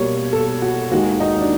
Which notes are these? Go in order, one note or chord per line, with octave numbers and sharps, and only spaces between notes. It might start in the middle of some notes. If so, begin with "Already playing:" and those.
Already playing: B2 G3 A#3 C#5
A4
F#4
D#2 D#3 G#3 F#4
D#4
D4